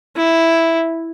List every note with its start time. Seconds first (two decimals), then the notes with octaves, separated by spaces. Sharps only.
0.16 E4